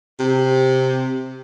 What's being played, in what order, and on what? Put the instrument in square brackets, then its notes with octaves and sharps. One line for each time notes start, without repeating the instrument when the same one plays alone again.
[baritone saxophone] C3